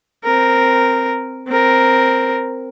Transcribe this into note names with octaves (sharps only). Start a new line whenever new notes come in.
C4 A#4
C4 A#4